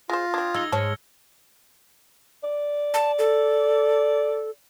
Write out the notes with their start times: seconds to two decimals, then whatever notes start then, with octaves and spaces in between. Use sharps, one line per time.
0.10 G#3 F4 C5 A#6
0.34 C4 D4 D#6 G#6
0.54 G#3 D#4 E6 G#6 G7
0.72 G#2 G#3 C#5 A5 F6 C#7
2.43 D5
2.94 A5
3.19 A4